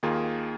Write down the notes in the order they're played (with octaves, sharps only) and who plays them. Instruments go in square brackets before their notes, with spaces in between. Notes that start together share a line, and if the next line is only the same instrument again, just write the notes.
[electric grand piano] D#2 D#3 A#3 F4 G#4